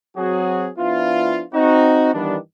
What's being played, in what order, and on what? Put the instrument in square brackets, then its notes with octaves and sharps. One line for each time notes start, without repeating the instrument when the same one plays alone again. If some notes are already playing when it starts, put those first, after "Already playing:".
[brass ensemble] F#3 C4 F#4 G#4
F3 B3 D4 E4 F4
C4 D#4 F#4
G2 D#3 E3 G3 B3 D4